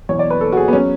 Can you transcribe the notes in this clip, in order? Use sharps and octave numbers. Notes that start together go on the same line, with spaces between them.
E2 B2 F#3 C#5
D5
B4
A4
F#4
G#4
B3
F#3 C#4